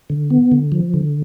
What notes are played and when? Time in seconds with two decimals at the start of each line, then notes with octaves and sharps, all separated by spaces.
0.10 D3
0.30 B3
0.52 D3
0.72 F3
0.94 D3